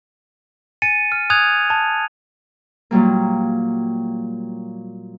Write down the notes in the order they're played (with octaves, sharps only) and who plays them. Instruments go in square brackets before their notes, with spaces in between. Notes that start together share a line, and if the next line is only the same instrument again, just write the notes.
[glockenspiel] G#5 A6 C#7 D#7
F6
G#5 D#6 F#6 G#6 F7
A5
[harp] A#2 F#3 G3 A#3